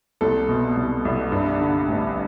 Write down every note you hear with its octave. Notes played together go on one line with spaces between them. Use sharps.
C2 A4
B2
C2
C2
G2
D3
A1